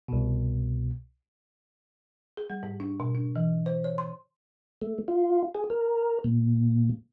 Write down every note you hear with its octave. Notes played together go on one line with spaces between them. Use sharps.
C2 B2
G#4
G3
G#2
D4
B2
D4
E3
C5
C#5
C6
A3
F4
G#4
A#4
A#2